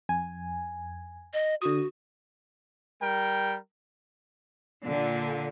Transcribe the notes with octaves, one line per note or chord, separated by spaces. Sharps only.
F2 G#5
D#5
D3 F#4 D#6
G3 A#4 G5
A#2 D3